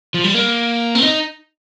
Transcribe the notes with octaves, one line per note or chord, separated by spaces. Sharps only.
F3
G3
A#3
C4
D#4